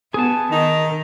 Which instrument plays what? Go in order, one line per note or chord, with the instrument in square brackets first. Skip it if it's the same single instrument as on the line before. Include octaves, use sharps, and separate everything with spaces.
[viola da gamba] B3 [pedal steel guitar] G#4 A5
[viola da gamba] D#3 [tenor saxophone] D#4